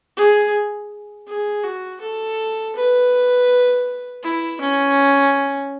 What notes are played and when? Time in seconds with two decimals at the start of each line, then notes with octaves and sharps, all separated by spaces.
0.17 G#4
1.28 G#4
1.64 F#4
2.01 A4
2.76 B4
4.23 E4
4.60 C#4